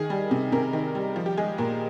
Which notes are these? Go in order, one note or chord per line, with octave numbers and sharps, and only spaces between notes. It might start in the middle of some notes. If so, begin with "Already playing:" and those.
Already playing: D#3 G#4
G3
C3
C3 A#4
D#3
G3
F3
G4
G#3 G#4
A#2 A#4